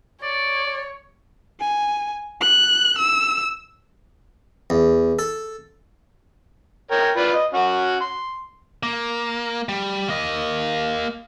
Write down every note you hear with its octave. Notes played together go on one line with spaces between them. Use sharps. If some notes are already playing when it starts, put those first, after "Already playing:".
C#5 D5
G#5
F#6
E6
E2
A4
A#4 C#5 G5
F4 B4 D5
D#5
C#4 F#4 F#5
C6
A#3
G3
A#3 D#5